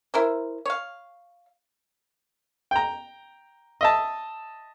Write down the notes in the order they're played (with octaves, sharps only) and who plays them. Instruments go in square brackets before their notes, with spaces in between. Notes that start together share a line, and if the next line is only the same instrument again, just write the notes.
[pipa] E4 A#4 C5
C#5 F5
[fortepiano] G5 A#5
D#5 E5 A5